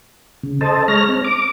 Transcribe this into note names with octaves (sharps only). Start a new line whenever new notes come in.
C#3
A4 C5 D#5 A5
G#3 C#5 A#5 F6 A#6
C4
D6